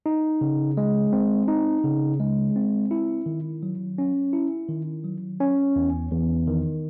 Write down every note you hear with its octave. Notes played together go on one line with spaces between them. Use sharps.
D#4
C#3
G#3
C4
D#4
C#3
G#3
C4
E4
D#3
F#3
C#4
E4
D#3
F#3
C#4
E2
E2
D#3